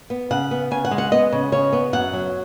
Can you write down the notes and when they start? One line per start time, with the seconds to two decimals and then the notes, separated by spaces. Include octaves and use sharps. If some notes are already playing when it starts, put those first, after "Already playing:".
0.10 B3
0.31 C#3 F#5
0.51 B3
0.71 C#3 G#5
0.85 F#5
0.91 G#3
0.98 F#5
1.12 B3 D#5
1.32 C#3
1.52 C#3 C#5
1.73 B3
1.93 F#2 F#5
2.13 F#3